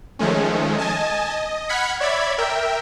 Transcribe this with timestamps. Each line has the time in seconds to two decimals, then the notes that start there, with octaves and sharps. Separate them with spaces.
0.19 D#3 F3 G#3 A3 C#4
0.78 D#5 G#5 A5
1.30 D#5
1.69 F#5 B5 F6 G#6 B6 C#7
2.00 C#5 D5 E5 B5 G#6
2.38 A#4 E5 G5